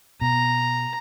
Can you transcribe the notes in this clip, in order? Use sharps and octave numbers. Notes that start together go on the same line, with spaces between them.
B2 A#5